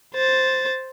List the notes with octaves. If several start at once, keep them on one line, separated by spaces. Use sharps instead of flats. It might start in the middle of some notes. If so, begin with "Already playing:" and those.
C5 A6